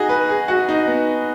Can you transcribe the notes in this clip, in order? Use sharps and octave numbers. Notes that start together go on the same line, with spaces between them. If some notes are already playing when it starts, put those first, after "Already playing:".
Already playing: D#4 F#4 G#4
B4
G#4
F#4
D#4
B3